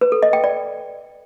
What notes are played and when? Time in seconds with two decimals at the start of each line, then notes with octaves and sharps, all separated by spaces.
0.01 B4
0.12 A4
0.23 D#5
0.33 G5
0.44 D5